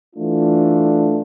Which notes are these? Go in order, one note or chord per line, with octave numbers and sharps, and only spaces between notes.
E3 A3 D4 F4